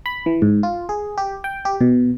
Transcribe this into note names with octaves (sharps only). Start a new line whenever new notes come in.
B5
E3
G#2
F4
G#4
G4
G5
G4
B2